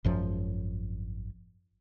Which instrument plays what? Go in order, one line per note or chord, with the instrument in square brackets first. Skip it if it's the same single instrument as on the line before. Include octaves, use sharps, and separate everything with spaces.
[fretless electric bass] G#1 F#2 F3